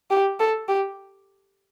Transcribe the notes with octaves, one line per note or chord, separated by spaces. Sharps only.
G4
A4
G4